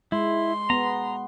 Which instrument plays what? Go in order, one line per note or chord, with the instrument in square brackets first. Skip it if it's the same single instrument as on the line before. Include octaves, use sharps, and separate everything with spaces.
[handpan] G#3 [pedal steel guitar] E4 [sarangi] C6
[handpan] B3 [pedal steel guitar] A#5